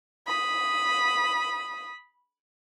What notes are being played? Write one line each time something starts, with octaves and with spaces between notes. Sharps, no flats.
B5 D#6